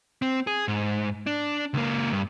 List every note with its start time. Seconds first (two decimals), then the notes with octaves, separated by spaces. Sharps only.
0.22 C4
0.47 G#4
0.68 G#2
1.27 D4
1.74 C#2 A#3
2.12 G2